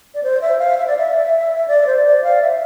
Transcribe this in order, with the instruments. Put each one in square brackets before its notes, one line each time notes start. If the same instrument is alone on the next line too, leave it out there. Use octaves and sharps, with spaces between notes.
[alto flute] D5
C5
E5
F5
E5
D5
E5
D5
C5
D5
F5
E5